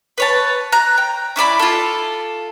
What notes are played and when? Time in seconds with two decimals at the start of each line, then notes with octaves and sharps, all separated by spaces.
0.18 B4 C#5 A5
0.72 A#5 F#6
0.98 G5
1.36 C#4 E4 D5 B5
1.60 F4 A4